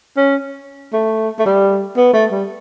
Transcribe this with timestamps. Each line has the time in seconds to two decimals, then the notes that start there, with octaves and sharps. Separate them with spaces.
0.17 C#4
0.93 A3
1.39 A3
1.46 G3
1.97 B3
2.13 A3
2.31 G3